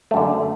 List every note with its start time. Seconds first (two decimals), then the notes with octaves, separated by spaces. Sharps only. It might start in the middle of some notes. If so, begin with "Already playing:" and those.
0.11 A3
0.14 F#2
0.17 D3